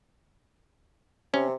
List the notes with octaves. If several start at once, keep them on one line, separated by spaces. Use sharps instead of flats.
C3 C#4